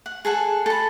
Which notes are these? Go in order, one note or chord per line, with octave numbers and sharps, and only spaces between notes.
F#5
G#4 A4 F#5 G#5
A4 B5